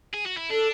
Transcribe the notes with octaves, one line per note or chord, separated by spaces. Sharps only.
G#4
F#4
E4
D4 A4